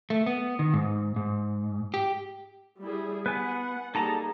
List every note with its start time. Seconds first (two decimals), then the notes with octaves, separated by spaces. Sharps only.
0.10 A3
0.26 B3
0.59 D#3
0.74 G#2
1.16 G#2
1.94 G4
2.80 G3 E4 G#4
3.26 B3 B4 F#5 G#5
3.95 G3 A#3 D#4 G#4 A4 A5 A#5